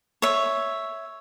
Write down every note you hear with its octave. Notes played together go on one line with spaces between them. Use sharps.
C#5 E5